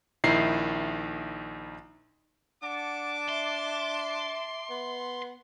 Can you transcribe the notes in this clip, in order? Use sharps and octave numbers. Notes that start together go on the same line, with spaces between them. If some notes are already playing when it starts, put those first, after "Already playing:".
A#1 D#3 D#4 E4 C7
D4 F#5 A5 D6
E5 C6
B3